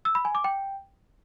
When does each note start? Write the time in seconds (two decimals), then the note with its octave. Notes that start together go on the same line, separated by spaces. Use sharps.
0.05 E6
0.15 B5
0.25 G#5
0.35 D6
0.44 G5